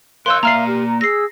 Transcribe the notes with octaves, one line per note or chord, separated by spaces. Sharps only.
A#4 C#5 F5 C6 E6 F#6 G6
A#3 D5 E5 F5 A#5 F6 C7
G4
A#5
G#4 E6 A#6 C7